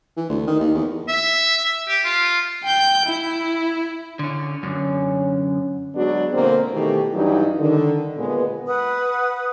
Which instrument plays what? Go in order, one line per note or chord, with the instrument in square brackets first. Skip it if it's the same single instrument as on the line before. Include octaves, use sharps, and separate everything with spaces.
[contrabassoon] E3
D2
D#3
D#2
E2
[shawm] E5
G4
F4
[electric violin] G5 G6
E4
[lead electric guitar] D3 C#4
[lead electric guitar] F#2 D3 [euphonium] C#4
[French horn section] F#3 G#3 B3 D4 F#4
B2 D3 A#3 C4
B2 D#3 E3 A3 G4
G2 E3 F#3 G3 D4 D#4
D3 D#3
D#2 A#2 G#3 B3
[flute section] B4 F#5 D#6